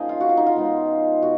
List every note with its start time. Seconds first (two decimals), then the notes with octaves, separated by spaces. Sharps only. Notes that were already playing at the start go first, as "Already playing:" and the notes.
Already playing: A#2 F3 A#3 C#4 D#4 G#4 A#4
0.09 F4
0.20 F#4
0.29 F4
0.37 D#4
0.46 F4
0.54 B2 G#3 B3 D#4
1.22 B2 F#4